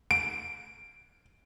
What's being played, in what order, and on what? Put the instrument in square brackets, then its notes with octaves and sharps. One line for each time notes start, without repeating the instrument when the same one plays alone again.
[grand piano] D7